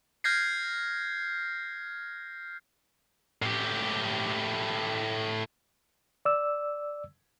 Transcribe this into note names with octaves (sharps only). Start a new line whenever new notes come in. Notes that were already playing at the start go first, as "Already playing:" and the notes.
F6 G6 G#6 A#6 C7
A2 G4
D5 E6